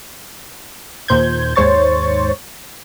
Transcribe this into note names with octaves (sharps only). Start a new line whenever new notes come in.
D#2 A#2 C5 G6 G#6
D#2 G#2 C5 C#5 C#6 A6